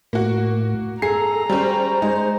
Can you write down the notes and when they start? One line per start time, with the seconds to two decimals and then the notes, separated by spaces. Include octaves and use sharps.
0.13 A2 A#3 F#4
1.02 G#4 A4 A#5 C7
1.49 G3 C#4 C5
2.02 G#3 D#4